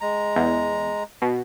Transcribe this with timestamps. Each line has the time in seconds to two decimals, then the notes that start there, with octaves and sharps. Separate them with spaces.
0.01 G#3 A#5
0.36 E2
1.22 B2